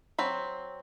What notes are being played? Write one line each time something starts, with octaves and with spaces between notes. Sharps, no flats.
F#3 C4 B5